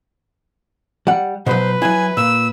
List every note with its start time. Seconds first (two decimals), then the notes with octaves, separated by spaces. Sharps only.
1.07 G3 F#5
1.46 B2 F#3 B4 C5
1.82 F#3 E4 G#5
2.17 A#2 E6